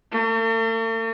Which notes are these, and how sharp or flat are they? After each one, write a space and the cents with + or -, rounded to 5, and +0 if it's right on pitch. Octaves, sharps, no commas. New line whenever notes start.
A3 +45